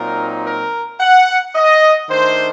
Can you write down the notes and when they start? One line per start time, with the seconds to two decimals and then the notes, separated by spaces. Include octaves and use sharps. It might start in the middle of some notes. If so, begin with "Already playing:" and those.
Already playing: A#2 F#3 C4 D#4 A#4
0.46 A#4
1.00 F#5
1.55 D#5
2.10 D#3 A3 D4 C5